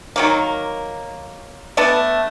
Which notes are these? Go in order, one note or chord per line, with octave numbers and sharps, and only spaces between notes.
D#3 F#3 A#3
A3 B3 D4 A5